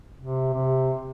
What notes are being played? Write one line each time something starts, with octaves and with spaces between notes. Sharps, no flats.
C3
C3